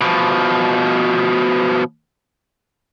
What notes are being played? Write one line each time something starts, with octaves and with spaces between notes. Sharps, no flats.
B2 F3